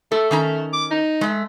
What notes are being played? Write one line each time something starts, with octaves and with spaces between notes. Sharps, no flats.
A3 A4
D#3 C#4 A#5
D6
D#4
G#3 A3